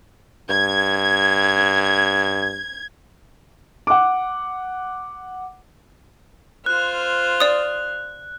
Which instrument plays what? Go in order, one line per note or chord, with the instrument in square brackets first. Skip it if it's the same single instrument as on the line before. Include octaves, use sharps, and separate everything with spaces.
[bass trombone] G2 [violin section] G#6
[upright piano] F#5 D6
[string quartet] F4 C5 F6 [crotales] F#6
[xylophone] D5 D#6